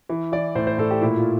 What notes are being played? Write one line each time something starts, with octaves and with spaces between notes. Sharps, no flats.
E3
E3 D5
A2 C5
C5
A2 A4
G4
A#2 E4
F4